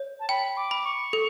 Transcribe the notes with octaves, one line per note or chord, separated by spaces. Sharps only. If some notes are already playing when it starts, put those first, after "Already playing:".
Already playing: C#5
A5
G5 B5
D6
B5
C#6
A4